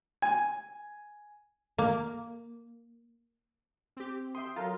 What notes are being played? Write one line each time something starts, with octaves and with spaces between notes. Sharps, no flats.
G#5
A#3
C4 G4
E5 G5 C6 D#6
F#3 F4 A4 A#4 A#5